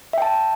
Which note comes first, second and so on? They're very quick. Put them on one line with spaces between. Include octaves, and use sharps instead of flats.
E5 G5 A5